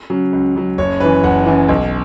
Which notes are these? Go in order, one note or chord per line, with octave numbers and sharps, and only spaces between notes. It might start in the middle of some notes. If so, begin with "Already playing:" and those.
C#3 F#3
C#2
C#3 F#3
F#1 C#5
F#2 E3 B4
F#1 F#5
F#2 E3
B1